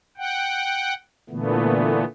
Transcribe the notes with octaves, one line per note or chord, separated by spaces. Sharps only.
F#5 G5
A#2 D3 E3 A3 B3